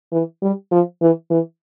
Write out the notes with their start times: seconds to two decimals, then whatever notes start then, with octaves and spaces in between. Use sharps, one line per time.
0.12 E3
0.42 G3
0.71 F3
1.01 E3
1.30 E3